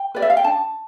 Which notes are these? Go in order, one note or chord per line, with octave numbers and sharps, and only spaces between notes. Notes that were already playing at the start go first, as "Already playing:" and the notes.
Already playing: G5
G4 B4 D5
E5
F5
G5
D4 A5